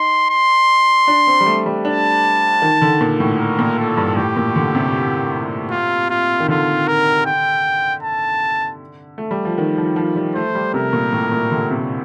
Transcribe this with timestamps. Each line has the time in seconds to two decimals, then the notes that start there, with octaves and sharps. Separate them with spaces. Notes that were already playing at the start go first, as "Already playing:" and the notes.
Already playing: D#4 C6
0.30 C6
1.07 D4
1.27 C4
1.41 G3
1.46 A3
1.66 G3
1.85 D4 A5
2.62 D#3
2.82 D3
3.01 A#2
3.20 A2
3.39 A#4
3.59 A#2
3.78 A4
3.97 G2
4.16 A2 G4
4.36 A#2
4.56 D3
4.75 C3
5.71 F4
6.10 F4
6.40 D#3
6.48 D3 F4
6.88 A#4
7.26 G5
8.03 A5
9.18 A3
9.31 G3
9.45 F3
9.58 D#3
9.78 F3
9.96 F3
10.16 G3
10.35 A3 C5
10.55 G3
10.74 C3 A#4
10.93 A#2
11.13 A2
11.32 A#2
11.51 D3
11.71 C3